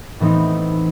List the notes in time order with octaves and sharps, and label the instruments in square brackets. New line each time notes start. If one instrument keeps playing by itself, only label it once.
[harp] A2 E3 B3 C4 D#4